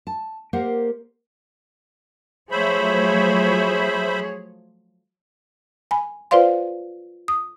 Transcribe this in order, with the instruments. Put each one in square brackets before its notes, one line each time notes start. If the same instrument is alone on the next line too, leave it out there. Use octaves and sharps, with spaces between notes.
[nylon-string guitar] A5
A#3 G4 A#4 C5 F5 F#5
[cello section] F3 F#3 A3 [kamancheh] G#4 C#5 [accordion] C5 E5 B5
[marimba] G#5 B5
F4 B4 C5 D5 F5 C6
D#6